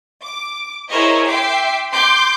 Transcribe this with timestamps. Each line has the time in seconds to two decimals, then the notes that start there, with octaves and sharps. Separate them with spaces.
0.22 D6
0.90 E4 G#4 A#4 C5 C#5 D#5
1.26 E5 G5 C6 D6 C7
1.91 C6 D6 G6